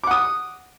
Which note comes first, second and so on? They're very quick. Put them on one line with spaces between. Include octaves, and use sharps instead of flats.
D6 F#5 D#6